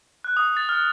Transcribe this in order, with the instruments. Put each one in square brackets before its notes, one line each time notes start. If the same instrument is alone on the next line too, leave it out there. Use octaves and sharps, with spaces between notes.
[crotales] F#6
D#6
A6
F6